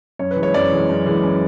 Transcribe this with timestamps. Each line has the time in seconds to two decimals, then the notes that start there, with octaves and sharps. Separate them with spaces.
0.19 F#2 C#5
0.31 B4
0.36 E3
0.42 G#3 C#5
0.54 F#2 D5
0.71 E3 G#3
0.89 F#2
1.06 E3 G#3
1.23 F#2